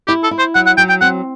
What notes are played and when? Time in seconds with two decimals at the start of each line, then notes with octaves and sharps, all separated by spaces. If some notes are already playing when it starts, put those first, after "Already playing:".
0.08 E4 G4
0.24 A4
0.31 E4
0.39 C5
0.55 F#3 F#5
0.66 F#5
0.77 F#3 G5
0.90 G5
1.01 C4 F#5